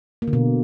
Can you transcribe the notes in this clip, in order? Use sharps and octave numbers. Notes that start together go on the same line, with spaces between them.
A#3
D3
B2